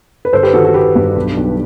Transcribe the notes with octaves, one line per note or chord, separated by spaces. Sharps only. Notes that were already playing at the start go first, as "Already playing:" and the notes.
B4
G1 A4 C5
G4 B4
D#3 F#4 A4
F#4 A4
G1 G4 B4
G2
B1
B1